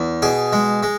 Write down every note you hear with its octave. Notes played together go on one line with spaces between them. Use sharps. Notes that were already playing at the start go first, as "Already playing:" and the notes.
Already playing: E2
B2 G#4
G#3
G#3